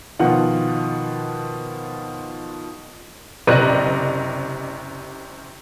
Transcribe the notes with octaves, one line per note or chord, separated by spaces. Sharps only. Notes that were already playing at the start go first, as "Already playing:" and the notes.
B2 D#3 F3 F4 F#5
F#1 C3 D5 D#5 F#6